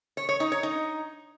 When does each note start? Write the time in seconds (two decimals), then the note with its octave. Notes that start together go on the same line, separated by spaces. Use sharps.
0.17 C#5
0.29 C#5
0.40 D#4
0.52 C#5
0.63 D#4